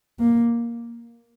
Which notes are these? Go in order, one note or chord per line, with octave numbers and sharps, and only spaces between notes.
A#3